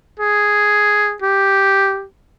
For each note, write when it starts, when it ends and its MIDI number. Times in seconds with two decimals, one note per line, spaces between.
0.20 1.15 68
1.22 2.05 67